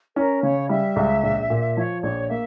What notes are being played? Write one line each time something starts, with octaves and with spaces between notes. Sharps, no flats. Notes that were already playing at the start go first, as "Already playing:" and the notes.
C#4 A#4
C#3 C#5
G3 E5
C#2
A#1
A#2
F3 C#5
A#1 C#5
A#3 E5